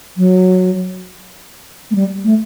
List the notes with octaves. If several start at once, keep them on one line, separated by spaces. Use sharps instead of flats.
F#3
A3
G3
A3